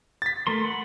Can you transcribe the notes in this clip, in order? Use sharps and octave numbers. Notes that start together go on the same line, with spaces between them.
A6 B6
A3 A#4 C6
F#5 B5